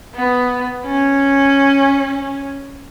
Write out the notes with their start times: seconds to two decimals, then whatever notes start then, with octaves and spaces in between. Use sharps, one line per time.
0.15 B3
0.86 C#4